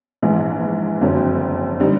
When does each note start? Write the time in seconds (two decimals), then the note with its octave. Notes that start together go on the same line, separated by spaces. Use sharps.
0.22 A#1 G#2 E3
1.01 F#1 F2 D3 F#3
1.80 D3 G3 C4 D#4